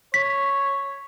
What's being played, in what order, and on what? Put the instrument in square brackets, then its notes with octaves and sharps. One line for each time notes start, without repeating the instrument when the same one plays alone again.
[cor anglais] C#5 [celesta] B6